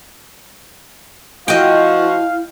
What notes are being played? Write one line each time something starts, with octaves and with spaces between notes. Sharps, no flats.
F3 E4 F#4 D#5 F5 G5